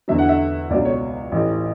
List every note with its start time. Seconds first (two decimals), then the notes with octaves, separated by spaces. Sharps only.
0.08 E2 D3 F#3 E5
0.18 F#5
0.29 E5
0.70 C#2 B2 F#3 D5
0.85 C#5
1.32 A1 A2 E3